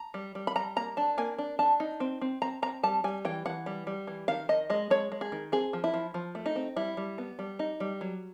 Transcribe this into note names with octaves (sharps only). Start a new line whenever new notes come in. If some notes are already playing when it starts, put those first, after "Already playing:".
Already playing: A#5
G3
G3
B5
G3 A#5
A#3 A#5
D4 A5
A#3 G#5
D4
D4 A5
D#4
C4
C4
C4 A#5
C4 A#5
G3 A5
G3 G#5
E3 G5
E3 F#5
G3
G3
E3
D#3 F5
D#3 D#5
G#3 D#5
G#3 C#5
G#3
G#4
D#3
C4 G#4
F3
E4
F3
F3
A3
D#4
C4
G3 E4
G3
B3
G3
D#4
G3
F#3